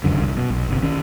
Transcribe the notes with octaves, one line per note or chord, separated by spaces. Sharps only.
F1 C#2 F#2 D3
C2
B2
B1
G1 C3
D#3 C#4